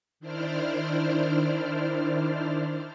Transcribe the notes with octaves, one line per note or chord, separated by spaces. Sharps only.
D#3 D4 E4 C5 D5 F6